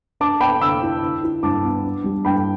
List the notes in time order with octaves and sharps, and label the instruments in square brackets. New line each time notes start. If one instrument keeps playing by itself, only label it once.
[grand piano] D4 [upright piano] A5 D6
[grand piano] B3 [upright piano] G5 B5
[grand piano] D3 [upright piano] B5 E6
[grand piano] E4
D3
E4
[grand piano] G2 [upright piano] A5 D6
[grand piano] B3
D4
G3
[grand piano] G2 [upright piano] G5 B5